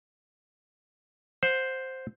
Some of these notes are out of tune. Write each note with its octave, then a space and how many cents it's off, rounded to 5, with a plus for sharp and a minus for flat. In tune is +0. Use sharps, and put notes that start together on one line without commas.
C5 +0 F#5 -25